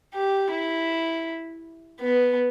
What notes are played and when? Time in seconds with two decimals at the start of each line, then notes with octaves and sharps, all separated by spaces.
0.14 G4
0.51 E4
2.01 B3